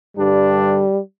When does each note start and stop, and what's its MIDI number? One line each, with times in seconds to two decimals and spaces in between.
0.17 0.83 43
0.17 0.83 50
0.17 0.99 55
0.17 0.83 62